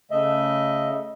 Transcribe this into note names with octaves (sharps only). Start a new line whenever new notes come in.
C#3 A3 D#5 E5